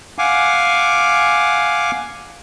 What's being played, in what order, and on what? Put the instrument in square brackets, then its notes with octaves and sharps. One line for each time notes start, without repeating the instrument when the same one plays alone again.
[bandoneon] F5 F#5 G#5 D6